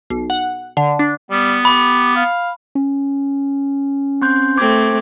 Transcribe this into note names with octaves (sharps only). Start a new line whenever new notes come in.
B1
F#5
D3
D4
G3 B3
G4 B5
F5
C#4
C4 C6 G6
A3 C4 D6 G#6